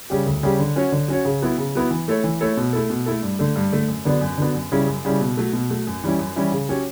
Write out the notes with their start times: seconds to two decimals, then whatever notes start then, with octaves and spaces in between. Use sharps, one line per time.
0.10 C#3 G3 C#4 G4
0.26 D2
0.43 C#3 G3 C#4 G4
0.60 D3
0.76 F#3 C#4 F#4 C#5
0.92 D3
1.08 F#3 C#4 F#4 C#5
1.25 C#3
1.42 F#3 B3 E4
1.58 C#3
1.75 F#3 B3 E4
1.91 E3
2.08 A3 E4 A4 C#5
2.24 E3
2.41 A3 E4 A4 C#5
2.57 B2
2.73 A3 E4 A4
2.90 B2
3.06 A3 E4 A4
3.23 G2
3.39 D3 A3
3.56 G2
3.72 D3 A3
3.88 F#2
4.05 D3 F#3 B3 D4
4.21 F#2
4.38 D3 F#3 B3 D4
4.55 F#2
4.72 C#3 G3 C#4 E4
4.88 F#2
5.05 C#3 G3 C#4 E4
5.21 B2
5.37 F#3 A3
5.53 B2
5.70 F#3 A3
5.87 F#2
6.04 E3 G3 C#4 E4
6.19 F#2
6.36 E3 G3 C#4 E4
6.52 C#3
6.69 F#3 C#4 G4 C#5